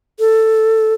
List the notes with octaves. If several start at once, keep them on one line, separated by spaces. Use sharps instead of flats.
A4